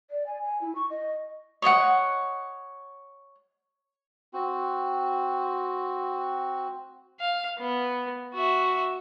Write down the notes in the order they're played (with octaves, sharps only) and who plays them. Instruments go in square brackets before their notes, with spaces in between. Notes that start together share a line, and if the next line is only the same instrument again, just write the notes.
[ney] D5
G#5
G#5
E4
C#6
D#5
[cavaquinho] C#5 D#5 E5 F#5
[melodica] C4 F#4
[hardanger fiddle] F5
B3
F#4 E5